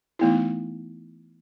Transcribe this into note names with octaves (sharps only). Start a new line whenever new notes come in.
E3 A3 B3 D#4 E4